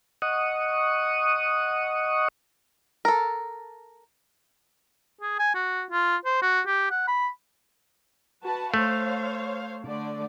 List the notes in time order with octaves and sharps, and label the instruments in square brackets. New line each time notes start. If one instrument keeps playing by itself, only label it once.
[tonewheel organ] D#5 F#5 C#6 D#6
[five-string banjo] A4 A#4
[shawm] G#4
G#5
F#4
F4
C5
F#4
G4
F#5
B5
[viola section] F#4 B4 A5
[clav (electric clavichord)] A3 [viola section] C5 C#5 F5
[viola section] D3 A3 D5